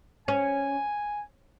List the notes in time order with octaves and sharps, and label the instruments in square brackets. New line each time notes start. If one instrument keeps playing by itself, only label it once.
[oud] C#4 [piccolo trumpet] G#5